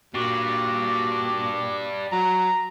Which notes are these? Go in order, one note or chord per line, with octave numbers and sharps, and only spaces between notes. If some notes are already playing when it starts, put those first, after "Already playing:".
A#2 D4 F#4 G4 D6
F#3 A#5